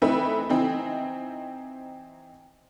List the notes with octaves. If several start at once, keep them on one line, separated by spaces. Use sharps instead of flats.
E3 A3 C4 D#4 B4 E5
E3 C4 D#4